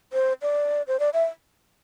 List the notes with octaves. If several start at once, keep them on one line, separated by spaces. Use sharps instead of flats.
C5
D5
C5
D5
E5